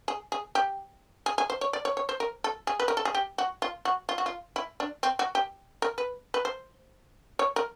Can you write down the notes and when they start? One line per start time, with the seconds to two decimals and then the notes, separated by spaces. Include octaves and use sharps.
0.08 G#4
0.32 G#4
0.55 G4
1.26 G#4
1.38 G#4
1.50 C5
1.61 C#5
1.73 D5
1.85 C#5
1.97 C#5
2.09 C5
2.20 A#4
2.44 A4
2.67 G#4
2.80 B4
2.88 A#4
2.97 A4
3.05 G#4
3.15 G4
3.38 F#4
3.62 F4
3.85 F#4
4.09 F4
4.18 F#4
4.26 F4
4.56 E4
4.80 D4
5.03 C4
5.19 F#4
5.35 G4
5.82 A#4
5.98 B4
6.34 B4
6.45 C5
7.39 C#5
7.56 A#4